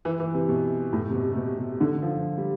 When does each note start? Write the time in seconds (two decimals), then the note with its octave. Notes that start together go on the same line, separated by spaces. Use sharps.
0.05 E3
0.20 E3
0.34 C3
0.49 B2
0.93 A2
1.10 C3
1.14 B2
1.32 C3
1.36 B2
1.58 C3
1.81 D3
2.02 F3
2.37 G3